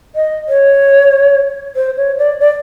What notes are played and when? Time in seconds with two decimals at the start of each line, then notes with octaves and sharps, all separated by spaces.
0.16 D#5
0.48 C#5
1.76 C5
1.97 C#5
2.18 D5
2.40 D5